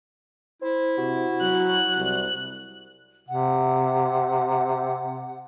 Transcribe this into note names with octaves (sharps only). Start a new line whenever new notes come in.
E4 C5
C3 F#4
F#3 F#6
C2
C3 F#5